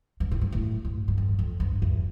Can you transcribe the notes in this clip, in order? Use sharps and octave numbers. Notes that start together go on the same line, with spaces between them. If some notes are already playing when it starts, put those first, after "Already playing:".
G2
A2
G2
A2
G2
G2
F2
F2
G2
E2